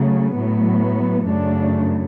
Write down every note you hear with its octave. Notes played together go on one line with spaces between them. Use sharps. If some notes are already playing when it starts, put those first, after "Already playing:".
Already playing: C#3 F#3 A3
A2 F#3 B3
F#2 C#3 F#3 A3 D4